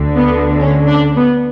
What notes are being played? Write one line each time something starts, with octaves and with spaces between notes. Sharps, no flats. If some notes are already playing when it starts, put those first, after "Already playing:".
Already playing: D2 D3
B3
C#4
D4
B3